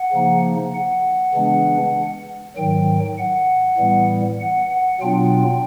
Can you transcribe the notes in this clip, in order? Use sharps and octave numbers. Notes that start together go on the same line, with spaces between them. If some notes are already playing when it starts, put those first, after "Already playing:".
Already playing: F#5
C#3 F3 A#3 D#4
F#5
C#3 E3 G#3 B3 D4
G#2 D#3 F#3 G5
F#5
A2 E3 G3 B3
F#5
F#5
B2 F#3 B3 D4 F4 G5